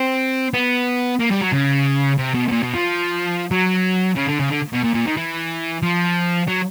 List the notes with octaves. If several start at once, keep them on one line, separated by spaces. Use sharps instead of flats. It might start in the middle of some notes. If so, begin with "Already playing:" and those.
Already playing: C4
B3
A#3
G3
F#3
C#3
C3
B2
B2
A#2
B2
F3
F#3
C#3
D3
C#3
D3
B2
A#2
A#2
D#3
E3
F3
F#3